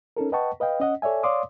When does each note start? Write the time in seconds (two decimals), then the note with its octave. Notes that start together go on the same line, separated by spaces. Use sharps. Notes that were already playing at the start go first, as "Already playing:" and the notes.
0.17 C#4 D#4 A4 A#4
0.32 B4 D#5 F#5 G5 A5 C#6
0.60 B4 D#5 F5 G5
0.80 C#4 D#5 F#5
1.02 A4 C#5 D5 E5 G#5
1.23 C#5 D5 F5 C6 D6 D#6